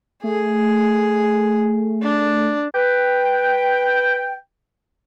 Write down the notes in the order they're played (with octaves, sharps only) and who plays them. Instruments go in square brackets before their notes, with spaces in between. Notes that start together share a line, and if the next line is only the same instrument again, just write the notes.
[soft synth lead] A3 [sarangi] G#4
[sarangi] D4
[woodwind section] B4 G5